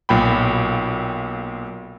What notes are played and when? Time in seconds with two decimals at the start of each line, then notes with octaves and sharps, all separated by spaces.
0.09 B1 A#2 G5 B5